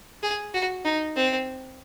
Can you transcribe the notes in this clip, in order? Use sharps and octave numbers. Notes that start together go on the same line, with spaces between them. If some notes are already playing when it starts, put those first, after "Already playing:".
G#4
F#4
D#4
C4